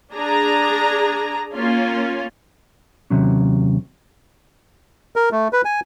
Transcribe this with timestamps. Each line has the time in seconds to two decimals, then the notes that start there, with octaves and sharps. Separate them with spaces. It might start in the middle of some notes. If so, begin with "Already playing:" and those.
0.14 D4 G#4 A#5
1.55 A#3 C#4 F4
3.10 D#2 C3 F#3 C#4
5.16 A#4
5.32 A3
5.53 B4
5.65 G#5